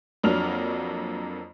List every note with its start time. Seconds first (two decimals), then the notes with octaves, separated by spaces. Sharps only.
0.23 F2 F#3 A#3 D4 F6 F7